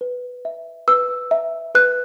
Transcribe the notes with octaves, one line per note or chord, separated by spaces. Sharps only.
B4
E5
B4 E6
E5
B4 F#6